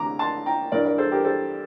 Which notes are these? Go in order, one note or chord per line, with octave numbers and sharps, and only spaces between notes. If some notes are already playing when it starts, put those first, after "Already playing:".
Already playing: D2 C3 E3 A#5 D6
A5 C6
G5 A#5
G2 E3 A#4 D5
A#4 D5
A4 C5
G4 A#4
A4 C5